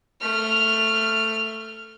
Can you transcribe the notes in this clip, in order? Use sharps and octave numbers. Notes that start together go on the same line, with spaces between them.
A3 F6